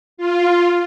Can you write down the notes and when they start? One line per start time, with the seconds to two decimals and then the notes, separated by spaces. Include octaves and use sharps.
0.17 F4